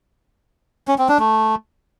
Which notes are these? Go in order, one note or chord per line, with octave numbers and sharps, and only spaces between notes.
C#4
C4
D4
A3